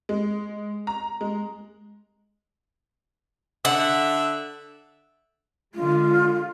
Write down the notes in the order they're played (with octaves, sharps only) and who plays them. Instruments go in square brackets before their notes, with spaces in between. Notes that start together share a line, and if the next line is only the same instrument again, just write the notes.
[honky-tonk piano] G#3
A#5
G#3
[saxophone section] D3 E5 [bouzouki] F#5
[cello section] D3 G#3 [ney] F4